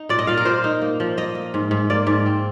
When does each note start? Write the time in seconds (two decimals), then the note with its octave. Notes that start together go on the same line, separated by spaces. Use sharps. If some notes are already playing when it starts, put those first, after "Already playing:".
Already playing: D#4
0.09 A#2 D5
0.19 D#5
0.27 A#2 F5
0.37 A#4
0.45 A#2 C5
0.64 D#4
0.82 A#3
1.00 F3
1.17 A#3 D#5
1.35 A#3
1.54 G#2
1.71 G#2
1.90 A#3 D5
2.07 G#2
2.26 C4